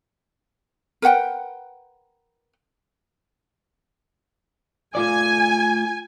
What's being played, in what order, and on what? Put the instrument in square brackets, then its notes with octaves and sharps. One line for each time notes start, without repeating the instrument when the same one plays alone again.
[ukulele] A#4 B4 F#5 G5
[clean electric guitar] A3 F4 D5 [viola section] G#5